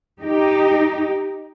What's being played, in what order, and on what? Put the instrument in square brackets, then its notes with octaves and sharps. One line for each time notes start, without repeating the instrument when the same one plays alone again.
[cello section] D#4 G4